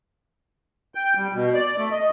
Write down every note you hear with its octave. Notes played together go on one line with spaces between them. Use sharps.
G5
G3
B2
D5
A3
D#5